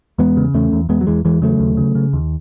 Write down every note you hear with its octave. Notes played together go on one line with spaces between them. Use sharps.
E2 G#3 B3
C#3
E2 A3 C#4
E2
E2 G#3 B3
F#3
E2 E3 G#3
E2 E3 G#3
C#3 F#3 A3
D#2
C#3
C#3
D#2